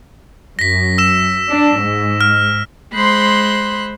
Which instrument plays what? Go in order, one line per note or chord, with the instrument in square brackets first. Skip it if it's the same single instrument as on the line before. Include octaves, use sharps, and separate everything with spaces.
[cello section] F#2 [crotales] A#6 B6
[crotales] E6 E7
[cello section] D4
G#2
[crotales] F6
[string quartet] G#3 C5 B5 C6 F#6